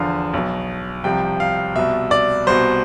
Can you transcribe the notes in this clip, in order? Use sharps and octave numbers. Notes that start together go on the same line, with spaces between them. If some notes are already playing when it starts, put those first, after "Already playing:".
Already playing: E2 D3 F3 F5
B1 B2
C2 C3 F3 G5
F5
C2 B2 E5
D5
C2 B2 C5